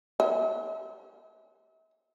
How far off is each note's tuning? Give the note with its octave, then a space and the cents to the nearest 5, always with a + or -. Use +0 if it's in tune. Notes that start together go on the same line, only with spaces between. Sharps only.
E5 -40